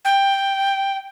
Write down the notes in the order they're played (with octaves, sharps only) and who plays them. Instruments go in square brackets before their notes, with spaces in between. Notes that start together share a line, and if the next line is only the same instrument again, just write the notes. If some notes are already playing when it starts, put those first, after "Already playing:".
[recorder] G5